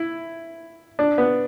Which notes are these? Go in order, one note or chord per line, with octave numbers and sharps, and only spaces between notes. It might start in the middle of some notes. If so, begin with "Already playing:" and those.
Already playing: E4
D4
B3